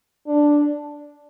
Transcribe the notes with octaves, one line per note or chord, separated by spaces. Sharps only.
D4